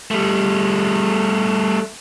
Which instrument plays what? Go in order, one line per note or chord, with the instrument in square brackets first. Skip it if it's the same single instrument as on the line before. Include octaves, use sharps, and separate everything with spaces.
[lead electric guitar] G3 A3